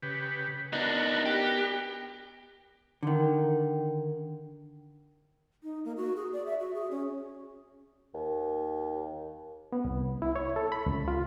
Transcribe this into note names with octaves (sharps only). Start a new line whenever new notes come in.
C#3 G4 B4
B3 D4 D#4 F#4 A#4
G4
D3 D#3
D#4
A#3
F#4
G#4
D5
E5
F#4
G#4
C#4
D#2
B3
C2
E4
C#5
A4
B5
C#2
F4